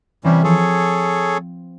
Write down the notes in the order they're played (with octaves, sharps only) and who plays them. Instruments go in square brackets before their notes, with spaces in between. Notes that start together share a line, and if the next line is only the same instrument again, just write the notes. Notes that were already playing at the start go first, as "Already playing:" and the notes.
[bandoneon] C3 G3 C#4 [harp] E3 C4
[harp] F3 G6 [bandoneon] G#4 A4 C#5